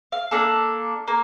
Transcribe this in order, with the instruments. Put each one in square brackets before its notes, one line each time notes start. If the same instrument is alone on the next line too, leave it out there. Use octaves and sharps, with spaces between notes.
[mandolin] F5
A#3 D4 A4
A#3